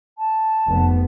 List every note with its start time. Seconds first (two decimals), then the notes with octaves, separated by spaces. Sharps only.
0.18 A5
0.69 F1 B3